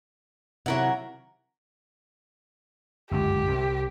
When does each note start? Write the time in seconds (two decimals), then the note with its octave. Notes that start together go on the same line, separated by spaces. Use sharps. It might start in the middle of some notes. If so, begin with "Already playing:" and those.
0.66 C3 D#3 F#3 E4 A#4 F#5
3.11 G1 C#2 F#2 G4
3.48 C2